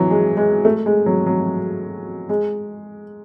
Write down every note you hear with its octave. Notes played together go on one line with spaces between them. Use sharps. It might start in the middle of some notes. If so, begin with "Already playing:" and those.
Already playing: E3 F#3
G#3
G#3
A3
G#3
F#3
F#3
G#3